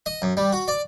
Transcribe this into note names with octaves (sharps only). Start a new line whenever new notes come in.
D#5
F#2
G3
F#4
D5